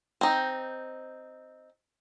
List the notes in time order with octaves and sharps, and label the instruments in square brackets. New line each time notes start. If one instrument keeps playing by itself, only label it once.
[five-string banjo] C4 D#4